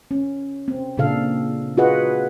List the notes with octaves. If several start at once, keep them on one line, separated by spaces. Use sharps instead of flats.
C#4
C4
A#2 C#3 D4 A4 F5
F4 F#4 G#4 B4 D#5 F#5